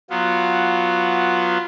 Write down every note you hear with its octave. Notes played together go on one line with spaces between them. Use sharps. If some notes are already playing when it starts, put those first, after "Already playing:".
F#3 B3 F4